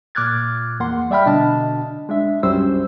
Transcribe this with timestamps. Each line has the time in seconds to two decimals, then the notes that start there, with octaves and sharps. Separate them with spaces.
0.15 A#2 D6 F6 F#6 G#6 A6
0.80 E2 A#3 F#5 C6
1.10 G3 D5 E5 G5 B5 F6
1.26 B2 D3 D4 D#5 A5
2.09 G#3 D4 E5
2.43 C2 F#2 G3 C#4 C5 E6